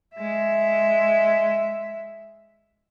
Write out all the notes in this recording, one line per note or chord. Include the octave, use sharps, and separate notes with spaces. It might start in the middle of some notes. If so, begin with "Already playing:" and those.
G#3 E5